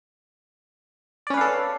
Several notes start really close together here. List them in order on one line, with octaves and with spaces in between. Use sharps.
D5 C#4 B4 F5 A4